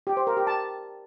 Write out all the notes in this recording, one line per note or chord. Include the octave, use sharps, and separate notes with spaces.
G4
C5
A#4
G4
A5